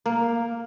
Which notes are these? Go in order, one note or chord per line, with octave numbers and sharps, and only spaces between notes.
A#3